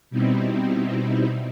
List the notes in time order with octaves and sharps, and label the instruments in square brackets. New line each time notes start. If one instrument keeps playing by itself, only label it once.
[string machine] B2 G3 C4 D#4 E4